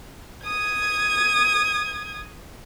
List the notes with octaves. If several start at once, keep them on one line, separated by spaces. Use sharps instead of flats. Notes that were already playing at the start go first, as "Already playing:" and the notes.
D#6 G#6